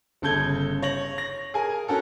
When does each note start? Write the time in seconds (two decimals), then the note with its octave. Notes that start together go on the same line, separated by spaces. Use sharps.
0.22 G1 C#3 A4 G6 G#6 G7
0.82 C#5 A#6 F#7
1.18 A#6
1.54 G#4 A#4 G#5
1.87 C#4 F#4 A4 A#4